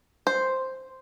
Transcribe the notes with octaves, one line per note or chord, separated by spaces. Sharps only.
C5